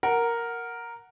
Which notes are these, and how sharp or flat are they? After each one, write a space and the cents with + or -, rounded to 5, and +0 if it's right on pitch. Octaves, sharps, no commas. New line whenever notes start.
A#4 +0 F#5 +0